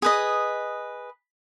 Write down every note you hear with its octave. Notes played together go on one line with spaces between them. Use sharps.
G#4 B4 D#5